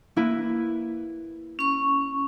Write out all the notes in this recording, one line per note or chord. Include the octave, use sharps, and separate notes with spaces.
A#3 E4 B4
C#4 C#6